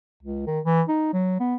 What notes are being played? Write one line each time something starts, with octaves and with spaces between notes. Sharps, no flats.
C#2
D#3
E3
D#4
F#3
B3